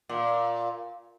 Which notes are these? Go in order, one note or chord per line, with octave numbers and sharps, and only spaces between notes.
A#2